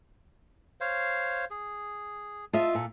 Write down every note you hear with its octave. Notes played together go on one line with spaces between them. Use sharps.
C5 C#5 F5
G#4
F4 D#5 E5 A5
A#2 A4